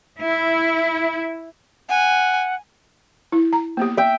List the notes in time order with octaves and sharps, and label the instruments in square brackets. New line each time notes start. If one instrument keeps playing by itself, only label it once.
[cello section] E4
[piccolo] F#5 [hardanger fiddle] G#5
[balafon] E4
A#5
A#3 B3 G4
[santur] E5 G5